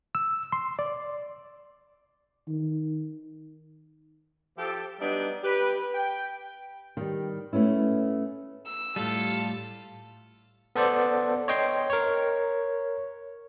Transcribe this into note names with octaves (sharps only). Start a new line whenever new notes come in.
E6
C6
D5
D#3
F3 G4 A4
F#3 G3 B3 D4 D#4
G4 B4
G5
D#3 G3
A3 B3 C#4 E4
E6
A2 G3 F4 A4
B3 A4 C5 D5
C#5 D#5 G5 C6
A#4 C#5